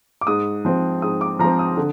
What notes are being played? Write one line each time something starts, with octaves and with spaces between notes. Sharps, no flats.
D6
G#2 D#6
F3 C4
G#2 D#6
D6
F3 C4 A#5
D#6
D3